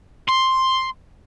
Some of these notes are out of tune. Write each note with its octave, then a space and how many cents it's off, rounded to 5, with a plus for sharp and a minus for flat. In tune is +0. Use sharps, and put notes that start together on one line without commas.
C6 +5